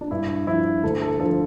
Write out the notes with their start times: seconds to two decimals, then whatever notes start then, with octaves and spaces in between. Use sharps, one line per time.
0.01 D4
0.11 G2 E4
0.47 F3 E4
0.83 D2 A4
1.02 A4
1.19 D3 F3 A4